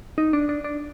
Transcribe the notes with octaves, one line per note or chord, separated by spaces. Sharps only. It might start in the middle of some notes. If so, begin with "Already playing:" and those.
D#4
D4
D4
D4